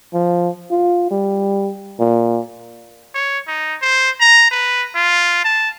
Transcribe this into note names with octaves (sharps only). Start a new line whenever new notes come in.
F3
F4
G3
A#2
C#5
D#4
C5
A#5
B4
F4
A5